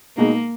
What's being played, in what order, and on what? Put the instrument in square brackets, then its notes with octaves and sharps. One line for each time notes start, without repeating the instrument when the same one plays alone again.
[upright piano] B2 G#3 D#4 [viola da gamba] A#3